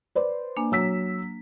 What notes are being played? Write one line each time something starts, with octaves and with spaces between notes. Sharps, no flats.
B4 C5 D5
A#3 D4 G#5
F#3 E6 B6